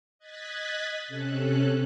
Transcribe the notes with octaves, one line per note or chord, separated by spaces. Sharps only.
D#5 F#6 G#6 A6 B6
C3 C#4 A4 F#6